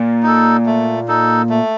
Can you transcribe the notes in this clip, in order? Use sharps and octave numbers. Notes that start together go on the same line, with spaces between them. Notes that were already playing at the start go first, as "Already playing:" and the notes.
Already playing: A#2
D#4 A4
A3
D#4 A4
A3